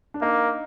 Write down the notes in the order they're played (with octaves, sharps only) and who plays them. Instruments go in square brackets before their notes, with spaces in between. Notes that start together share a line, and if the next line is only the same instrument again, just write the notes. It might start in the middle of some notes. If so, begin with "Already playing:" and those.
[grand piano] D4
[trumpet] A#3 [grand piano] D#4